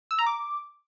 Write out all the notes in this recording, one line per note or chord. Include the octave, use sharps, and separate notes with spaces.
E6
A#5
D6